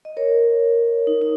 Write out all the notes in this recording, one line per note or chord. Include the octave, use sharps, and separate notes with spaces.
D#5
A#4 C#5
D#4
D#4